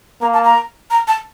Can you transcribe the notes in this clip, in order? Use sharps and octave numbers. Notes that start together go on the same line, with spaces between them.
A#3 A#5
A5
A#5
A#5
A5